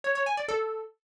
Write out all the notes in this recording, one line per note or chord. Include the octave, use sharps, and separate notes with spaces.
C#5
C#5
G#5
D5
A4